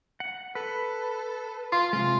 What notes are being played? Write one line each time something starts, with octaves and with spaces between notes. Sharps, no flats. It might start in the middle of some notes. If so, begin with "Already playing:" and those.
F#5
A4 B4
F4 C6
C3 G#3 F4